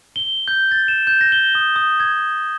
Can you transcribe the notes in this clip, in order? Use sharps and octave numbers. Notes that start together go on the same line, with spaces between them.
G7
G6
A6
E7
G6
A#6
G7
D#6
D#6
G#6